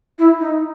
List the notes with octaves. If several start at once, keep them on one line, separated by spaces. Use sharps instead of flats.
E4
D#4